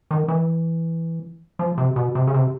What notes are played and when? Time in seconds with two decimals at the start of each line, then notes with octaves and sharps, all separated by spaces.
0.11 D#3
0.28 E3
1.59 F3
1.78 C3
1.96 B2
2.15 C3
2.27 C#3
2.34 C3